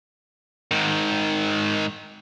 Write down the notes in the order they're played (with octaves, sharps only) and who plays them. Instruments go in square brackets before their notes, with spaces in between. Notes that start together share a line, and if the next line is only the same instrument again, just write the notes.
[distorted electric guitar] G#2 D#3